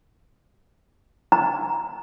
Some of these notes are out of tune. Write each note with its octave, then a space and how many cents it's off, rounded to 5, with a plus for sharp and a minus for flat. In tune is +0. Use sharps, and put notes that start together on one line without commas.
A#5 +10